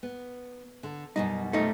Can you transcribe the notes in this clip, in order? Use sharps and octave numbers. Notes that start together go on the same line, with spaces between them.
B3
D3
F#2 B2 G3 D#4
A3 D#4